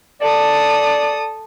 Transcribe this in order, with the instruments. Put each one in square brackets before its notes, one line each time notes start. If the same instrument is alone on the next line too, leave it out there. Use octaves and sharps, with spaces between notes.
[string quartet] A4 D#6 [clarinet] D5